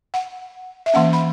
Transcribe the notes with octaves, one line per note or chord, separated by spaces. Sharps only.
F#5
E5
E3 A#3 C#4 F#5
B5